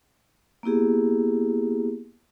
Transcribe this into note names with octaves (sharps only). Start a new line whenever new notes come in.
A#3 B3 E4 G4 G#4